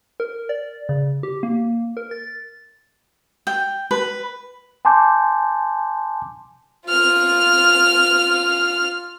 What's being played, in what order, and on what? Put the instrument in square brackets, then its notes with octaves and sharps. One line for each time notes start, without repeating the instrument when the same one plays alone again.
[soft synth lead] A#4
D5
C#3
G4
A#3
A#4
A6
[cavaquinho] G5
B4
[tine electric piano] G#5 A5 C6 D6 G6
[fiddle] F4 F6